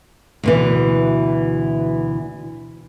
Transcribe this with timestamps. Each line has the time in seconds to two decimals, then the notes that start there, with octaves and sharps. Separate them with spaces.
0.43 D2 B2 E3